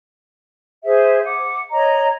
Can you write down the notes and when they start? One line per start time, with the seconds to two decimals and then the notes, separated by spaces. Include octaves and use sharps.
0.84 G#4 C5 E5
1.24 F#5 D6
1.71 C#5 D#5 A#5